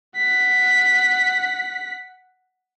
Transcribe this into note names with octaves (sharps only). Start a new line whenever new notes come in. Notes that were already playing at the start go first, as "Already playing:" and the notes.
F#5 B6